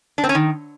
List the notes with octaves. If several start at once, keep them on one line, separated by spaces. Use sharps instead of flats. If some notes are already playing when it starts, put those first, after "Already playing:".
D4
C4
C#4
D#3